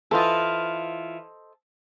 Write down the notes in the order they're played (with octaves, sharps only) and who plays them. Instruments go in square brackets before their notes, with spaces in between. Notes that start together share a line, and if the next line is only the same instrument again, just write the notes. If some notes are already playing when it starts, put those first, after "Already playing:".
[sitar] E3 F4 [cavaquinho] A4 C5 D#5